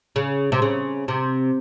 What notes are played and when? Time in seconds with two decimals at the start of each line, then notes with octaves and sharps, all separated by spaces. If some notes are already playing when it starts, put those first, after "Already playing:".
0.16 C#3
0.52 C3
0.62 C#3
1.08 C3